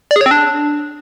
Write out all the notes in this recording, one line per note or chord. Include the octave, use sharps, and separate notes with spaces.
D5
G#4
C#5
C4
D4